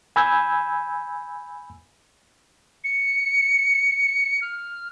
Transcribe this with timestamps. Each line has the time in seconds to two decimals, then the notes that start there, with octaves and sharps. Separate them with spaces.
0.16 G#5 B5 E6 G6 G#6
2.84 C#7
4.41 F6